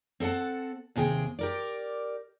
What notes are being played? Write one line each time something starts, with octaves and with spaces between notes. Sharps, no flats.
C4 A4 E5 F#5 A5
D#2 C3 G#4 B4 G5
G4 A#4 D5